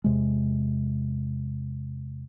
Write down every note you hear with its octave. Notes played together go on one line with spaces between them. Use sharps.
E2 C3 G#3